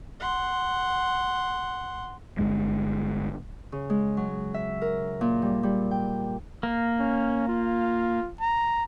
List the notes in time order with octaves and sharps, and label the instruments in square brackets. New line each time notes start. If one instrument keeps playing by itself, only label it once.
[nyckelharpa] F#5 C6
[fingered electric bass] G1 C2 G2 G#3
[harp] C#3
G#3
F#3
E5
A#4
A#2
G3
G3
G5
[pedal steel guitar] A#3
[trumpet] C#4
F4
A#5